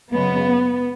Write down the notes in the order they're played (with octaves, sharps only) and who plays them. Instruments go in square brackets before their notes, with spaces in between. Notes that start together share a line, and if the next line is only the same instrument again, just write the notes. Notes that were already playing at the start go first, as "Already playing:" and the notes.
[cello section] F#2 C#3 G#3 B3